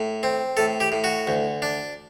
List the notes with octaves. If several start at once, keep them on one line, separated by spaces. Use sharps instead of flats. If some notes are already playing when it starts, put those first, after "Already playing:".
Already playing: A2
C4
A2 A4
G4
A2
F#4
D2
D4